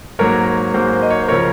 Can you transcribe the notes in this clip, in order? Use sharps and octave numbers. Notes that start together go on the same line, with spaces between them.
G#2 F#3 A#3 A#4 C#5
G#2 F#3 A#3 G#4 C5
D#5
C#5
C5
C#3 F3 A#4 C#5